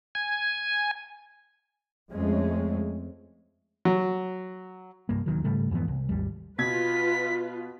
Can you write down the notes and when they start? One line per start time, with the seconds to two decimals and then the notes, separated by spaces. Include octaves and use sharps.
0.15 G#5
2.11 F2 G#3 A3 C4 C#4
3.85 F#3
5.09 C2 G2 A#3
5.26 D#1 B1 D#3 F#3
5.44 G#2 C#3 G3 A3
5.71 F2 G#2 E3 B3
5.88 C2
6.09 G#1 D#2 G3
6.58 B2 F4 B4 G#6 B6